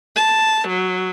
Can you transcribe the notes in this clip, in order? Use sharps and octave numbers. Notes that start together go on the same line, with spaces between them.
A5
F#3